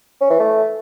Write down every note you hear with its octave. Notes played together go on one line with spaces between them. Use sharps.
C#4
E3
A3